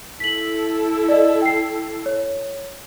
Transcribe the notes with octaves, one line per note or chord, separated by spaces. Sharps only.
E4 A4 B6 F#7
D5 D#5
G5 C7
C#5